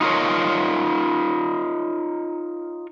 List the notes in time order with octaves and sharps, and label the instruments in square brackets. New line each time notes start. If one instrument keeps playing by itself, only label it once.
[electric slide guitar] D#4 F4 A#4 C#5